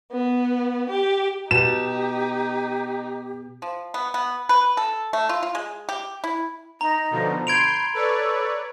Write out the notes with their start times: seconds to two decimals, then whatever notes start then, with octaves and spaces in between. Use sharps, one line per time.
0.12 B3
0.89 G4
1.51 B2 D#4 G4 E7
3.62 F3
3.94 B3
4.14 B3
4.49 B4
4.77 A4
5.13 A3
5.29 F4
5.43 F4
5.55 G#3
5.89 G4
6.24 E4
6.81 D#4 A#5
7.11 B2 D3 F3
7.47 B5 C6 G6 G#6 D7 F7
7.94 A4 B4 C#5 D5